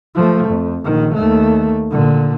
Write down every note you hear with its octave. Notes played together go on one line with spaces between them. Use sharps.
F3 A3
F2
A#1 D#3
D#2 A3
A#2 D3